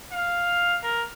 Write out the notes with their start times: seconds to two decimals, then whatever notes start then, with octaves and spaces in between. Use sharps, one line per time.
0.12 F5
0.83 A#4